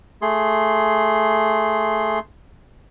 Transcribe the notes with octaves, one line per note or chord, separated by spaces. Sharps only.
A3 G#4 C6